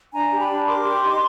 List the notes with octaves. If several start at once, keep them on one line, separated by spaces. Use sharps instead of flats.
D4 G#5 A#5
G4
A5 B5
D4
A#4 C6 D6
G4
D#4